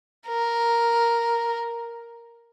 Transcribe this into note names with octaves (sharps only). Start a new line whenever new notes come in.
A#4